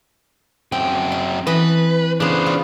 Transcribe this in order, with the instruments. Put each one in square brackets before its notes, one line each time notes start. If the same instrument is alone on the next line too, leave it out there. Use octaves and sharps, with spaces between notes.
[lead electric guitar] F#2 G5 [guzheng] C4
[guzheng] C6
[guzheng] E3 D#5 A5 [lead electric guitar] B4
[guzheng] C#3 B3 [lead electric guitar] D4 C5
[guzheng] F4